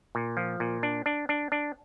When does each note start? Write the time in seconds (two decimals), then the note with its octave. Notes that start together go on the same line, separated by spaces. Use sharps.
0.15 A#2
0.37 F3
0.60 A#2
0.83 D4
1.06 D4
1.29 D4
1.52 D4